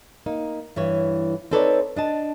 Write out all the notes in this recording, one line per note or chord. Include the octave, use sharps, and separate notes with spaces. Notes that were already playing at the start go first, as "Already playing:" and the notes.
A#3 D#4
G2 E3 E4 C#5
C4 D#4 A4 B4 C#5 D5
D4 D#5 A5